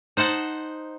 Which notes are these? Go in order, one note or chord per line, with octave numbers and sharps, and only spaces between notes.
D#4 C5 F#5 A5